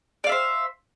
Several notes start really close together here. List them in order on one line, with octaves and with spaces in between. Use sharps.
D5 F5 E5 C5